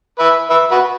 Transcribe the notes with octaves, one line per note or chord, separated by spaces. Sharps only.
B4 E5
B4 E5
F#4 B4